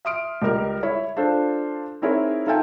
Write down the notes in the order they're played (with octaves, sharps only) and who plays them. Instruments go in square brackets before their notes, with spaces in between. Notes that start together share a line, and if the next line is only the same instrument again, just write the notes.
[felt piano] E5 C6 D#6 F6 D7
C#2 G3 A#4 F6
E4 C#5 B5
D4 F4 A4 C5
C4 D#4 E4 G#4 A#4 C#5
D#4 F4 A4 E5 G5 G#5